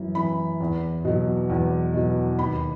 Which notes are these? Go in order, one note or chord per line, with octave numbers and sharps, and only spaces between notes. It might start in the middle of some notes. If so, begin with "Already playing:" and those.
Already playing: F#2 E3
E3 B5
E2
B2 F#3
E2
B2 F#3
D#2 B5